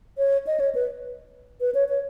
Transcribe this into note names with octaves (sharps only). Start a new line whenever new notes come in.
C#5
D#5
C#5
B4
B4
C#5
C#5